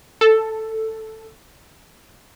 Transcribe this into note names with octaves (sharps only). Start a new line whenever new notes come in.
A4